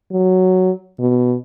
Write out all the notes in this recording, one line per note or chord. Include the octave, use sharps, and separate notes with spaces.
F#3
B2